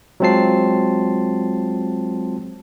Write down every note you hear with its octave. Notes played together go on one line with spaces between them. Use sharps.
F#3 G#3 C4 F4 A5 C7